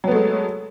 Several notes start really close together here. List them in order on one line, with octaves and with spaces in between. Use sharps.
F#3 B3 A3 G#3